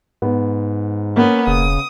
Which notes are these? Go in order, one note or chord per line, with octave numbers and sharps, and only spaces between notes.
G#2 B3
A#3 B3 C#4
E1 C#3 D#6